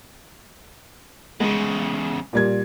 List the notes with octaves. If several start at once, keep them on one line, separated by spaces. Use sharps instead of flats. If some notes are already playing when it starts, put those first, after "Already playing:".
E2 C#3 G#3
A#2 G3 G#6